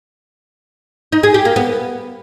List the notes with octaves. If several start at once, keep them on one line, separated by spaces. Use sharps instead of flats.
D#4
G#4
G4
A#3
B3